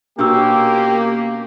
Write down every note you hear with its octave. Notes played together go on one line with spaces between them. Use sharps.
B2 A#3 C#4 D4 F4 G4 E6